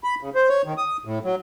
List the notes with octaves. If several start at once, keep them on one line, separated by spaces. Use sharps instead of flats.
B5
C#3
C5
C#5
D#3
D#6
A2
F#3